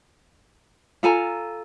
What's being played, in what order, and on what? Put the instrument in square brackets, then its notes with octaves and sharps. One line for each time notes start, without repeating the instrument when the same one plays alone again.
[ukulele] F4 A4 G#5 A#5